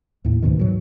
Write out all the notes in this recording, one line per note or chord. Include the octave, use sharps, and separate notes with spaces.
D#2 A2
D2 G#2 B2 D#3
G#2 B2 E3 F#3